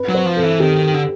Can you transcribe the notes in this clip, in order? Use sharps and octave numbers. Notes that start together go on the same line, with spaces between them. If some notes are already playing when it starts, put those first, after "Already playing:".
Already playing: B4
F#3
C5
F3
A4
E3
D#3 G4
D3